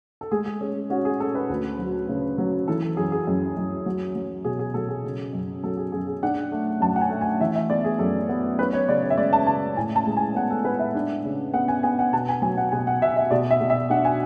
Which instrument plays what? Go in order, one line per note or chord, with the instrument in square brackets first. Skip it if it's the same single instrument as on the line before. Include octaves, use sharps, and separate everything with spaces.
[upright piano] A4
G#3 G#4
G#4
C#4 G#4
C#4 F#4
G#4
C#4 A4
B4
D2
F#3
C#3
F#3
E3 A4
A4
F#2 G#4
G#4
F#2
F#2
F#3
F#3
B2 G#4
G#4
F#3 A4
G#4
C#3
F#2
F#3 A4
G#4
F#2 G#4
G#4
D4 F#5
A3
F#2 A5
F#5
G#5
A3
G#5
E3 E5
E5
B3 D5
G#4
F#2 A4
B3
C#4 B4
C#5
C#3 D5
C#5
E5
G#3 D5
A5
C#3 A5
A2 G#5
A5
G#3
G#5
B3 F#5
A4
G#3 B4
E5
D4
C#3
B3 F#5
G#5
B3 G#5
F#5
B2 A5
G#5
F#3 G#5
F#5
B2 G#5
F#5
B2 E5
E5
B2 D5
E5
B2
E5
D4 F#5
G#5